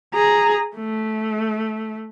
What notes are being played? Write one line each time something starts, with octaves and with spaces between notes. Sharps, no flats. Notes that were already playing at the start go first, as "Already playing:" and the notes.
G#4 A#5
A3